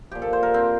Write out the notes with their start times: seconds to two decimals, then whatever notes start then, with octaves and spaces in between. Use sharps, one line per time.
0.11 A#2 F3 G4
0.22 A4
0.33 C5
0.43 A#4
0.54 C4